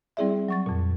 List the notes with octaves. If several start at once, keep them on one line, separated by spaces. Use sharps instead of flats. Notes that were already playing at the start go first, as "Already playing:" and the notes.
G3 C4 E4 G#4 D5 E5
F#3 C#6 A6
F2 A#2